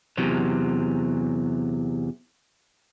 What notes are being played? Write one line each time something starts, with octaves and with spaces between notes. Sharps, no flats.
E2 C3 F#3